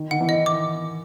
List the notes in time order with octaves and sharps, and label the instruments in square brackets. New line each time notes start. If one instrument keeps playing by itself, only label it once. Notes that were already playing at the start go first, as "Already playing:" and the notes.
Already playing: [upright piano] D#3
[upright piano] D#3 [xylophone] F#5
[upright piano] E3
[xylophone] D#5
D6